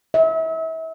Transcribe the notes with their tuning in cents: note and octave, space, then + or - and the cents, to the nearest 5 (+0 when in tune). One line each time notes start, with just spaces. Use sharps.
E5 -35